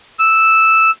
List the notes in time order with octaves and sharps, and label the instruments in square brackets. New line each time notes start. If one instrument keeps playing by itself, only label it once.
[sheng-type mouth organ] E6